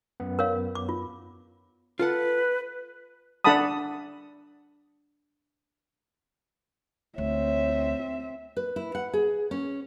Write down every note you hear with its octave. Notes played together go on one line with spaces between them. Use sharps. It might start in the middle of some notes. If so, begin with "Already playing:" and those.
F#2 B3
A#4 C#5 F5
D6
F4
F4 A4 B4 F#5
D4 A4 F#5 A5 B5 D#6
D2 C4 C#5 E5
B4
E4
F#5
G#4
C#4